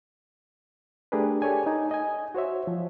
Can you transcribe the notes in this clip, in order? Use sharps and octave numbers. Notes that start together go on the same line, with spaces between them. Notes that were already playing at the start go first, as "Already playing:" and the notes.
A3 D4 G4 G#4 A#4 B4
G4 A4 C#5 D5 G#5
D#4 G#5
D#5 G#5
F#4 C5 C#5 E5
F3